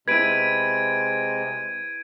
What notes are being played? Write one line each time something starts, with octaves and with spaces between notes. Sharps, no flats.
C3 G#3 E4 B4 G#6 D7 D#7